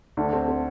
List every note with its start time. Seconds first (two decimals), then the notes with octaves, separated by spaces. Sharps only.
0.17 D2 D4
0.33 C4
0.48 C4